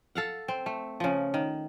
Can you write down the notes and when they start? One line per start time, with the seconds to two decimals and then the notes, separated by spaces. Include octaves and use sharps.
0.15 A4 F5 F#5
0.48 C4
0.66 A3
1.00 C#3 F3
1.34 D#3